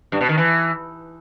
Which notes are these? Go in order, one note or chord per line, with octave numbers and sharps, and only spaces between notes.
G2
B2
D#3
E3